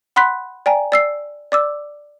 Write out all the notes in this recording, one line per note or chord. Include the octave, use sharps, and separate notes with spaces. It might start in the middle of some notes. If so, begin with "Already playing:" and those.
F#5 B5 C6 F#6 B6
D5 G5 G#5 A#5
D5 E6 C7
D5 D6 E6